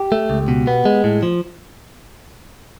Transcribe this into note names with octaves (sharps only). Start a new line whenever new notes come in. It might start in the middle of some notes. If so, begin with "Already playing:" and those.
Already playing: G4
A3
C#2
B2
B3
G#3
A2
F3